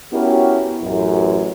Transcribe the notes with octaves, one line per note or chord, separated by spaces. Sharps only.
B3 C#4 E4 F#4 G4 A#4
A1 F#2